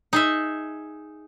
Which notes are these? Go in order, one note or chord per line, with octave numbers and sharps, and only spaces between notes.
D#4 G#4 E5